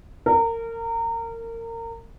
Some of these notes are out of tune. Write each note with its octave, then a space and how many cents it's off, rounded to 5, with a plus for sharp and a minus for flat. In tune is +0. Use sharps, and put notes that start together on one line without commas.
A#4 -25